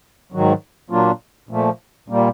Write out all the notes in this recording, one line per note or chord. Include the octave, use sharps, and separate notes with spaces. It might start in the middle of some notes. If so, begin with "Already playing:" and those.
G#2 D#3 F#3
A#2 F#3 A#3 D4 F4
A#2 F3 A3
A#2 G3 A#3